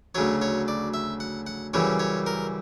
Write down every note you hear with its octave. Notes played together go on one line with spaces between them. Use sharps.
D2 C#3 F#3 C#5
C#5
D5
E5
F#5
F#5
F#2 C#3 E3 G3 C#5
C#5
A#4